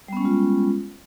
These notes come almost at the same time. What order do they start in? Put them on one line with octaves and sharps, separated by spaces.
G3 B3 C#4 G#3 F4